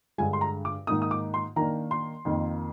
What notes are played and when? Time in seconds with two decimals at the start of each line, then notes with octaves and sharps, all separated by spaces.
0.18 G2 D3 G#3 G#5
0.33 C6
0.41 A#5
0.65 D6
0.87 G#2 D#3 A#3 D#4 D#6
1.02 D#6
1.11 D6
1.34 C6
1.56 D#3 A#3 D4 A#5
1.91 C6
2.25 F2 D#3 A#3